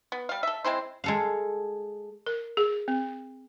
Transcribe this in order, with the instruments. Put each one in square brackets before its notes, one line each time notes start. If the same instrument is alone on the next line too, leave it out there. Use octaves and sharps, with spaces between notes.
[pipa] B3
G3 F5
A4 E5
G#3 C4 E4 C5
[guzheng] G#3 A4 F5
[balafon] A#4
G#4
C4